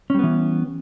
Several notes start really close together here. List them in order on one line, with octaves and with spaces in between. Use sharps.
C#4 G3 B3 E3